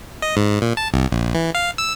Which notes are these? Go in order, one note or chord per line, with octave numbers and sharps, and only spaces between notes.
D#5
G#2
A#2
A5
C2
A#1
E3
F5
E6